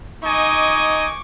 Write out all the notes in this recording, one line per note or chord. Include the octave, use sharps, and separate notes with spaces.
D#4 D#5 G#5 C#6 D6